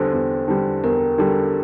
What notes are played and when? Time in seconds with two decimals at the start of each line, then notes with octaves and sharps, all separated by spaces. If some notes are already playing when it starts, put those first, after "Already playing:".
Already playing: E2 D3 G3 C5
0.13 E2
0.48 D3 G3
0.83 E2 A#4
1.18 D3 G3